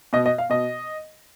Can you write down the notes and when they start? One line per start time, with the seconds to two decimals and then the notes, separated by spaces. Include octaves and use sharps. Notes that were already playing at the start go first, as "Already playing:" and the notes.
0.13 B2 D#5
0.26 D#5
0.38 F5
0.50 B2 D#5